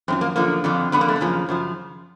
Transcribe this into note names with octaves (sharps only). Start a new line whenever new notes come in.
F#2 D3 F3 C4
A#3
F#2 D3 F3 A#3
F2 D3 F3
F2 D3 F3 B3
A#3
A3
A#3
F#2 C#3 F3
F#2 C#3 F3